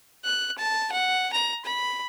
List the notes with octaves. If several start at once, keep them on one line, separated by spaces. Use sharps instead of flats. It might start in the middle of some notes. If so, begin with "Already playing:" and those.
F#6
A5
F#5
A#5
B5